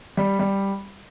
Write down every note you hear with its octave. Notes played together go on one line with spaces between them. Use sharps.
G3
G3